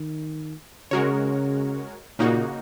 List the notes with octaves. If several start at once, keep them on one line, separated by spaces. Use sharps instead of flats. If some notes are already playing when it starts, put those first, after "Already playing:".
Already playing: D#3
C#3 G#3 F#4 A#4 C#5
A#2 C#3 A#3 D#4 F#4